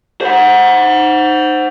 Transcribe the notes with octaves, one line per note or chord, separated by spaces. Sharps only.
C5 F#5